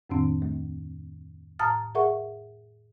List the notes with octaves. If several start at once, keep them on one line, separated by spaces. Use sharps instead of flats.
F2 A2 D#3 C4 D4
D2 A3
A2 A5 A#5 D#6 F6 A6
G#4 A#4 E5 F#5 C#6